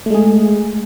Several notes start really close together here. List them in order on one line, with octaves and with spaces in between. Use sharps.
A3 G#3 G#4